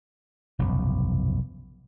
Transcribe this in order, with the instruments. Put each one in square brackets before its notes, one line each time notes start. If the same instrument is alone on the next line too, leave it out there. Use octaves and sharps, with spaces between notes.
[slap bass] F1 B1 G2 C#3